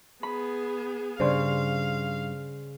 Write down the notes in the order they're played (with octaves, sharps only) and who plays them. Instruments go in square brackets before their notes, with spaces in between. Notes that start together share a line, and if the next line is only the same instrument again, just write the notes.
[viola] B3 G#4 [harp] B5
[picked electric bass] G2 [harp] C#3 [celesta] C5 D5 C6 [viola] F5